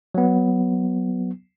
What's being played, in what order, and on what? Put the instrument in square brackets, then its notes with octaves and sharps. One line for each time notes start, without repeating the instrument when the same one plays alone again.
[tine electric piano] F#3 B3